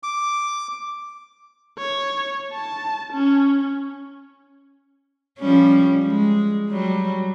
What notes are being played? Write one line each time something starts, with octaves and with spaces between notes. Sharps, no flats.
D6
C#5
A5
C#4
F3 G3 C#4
G#3
F#3 G3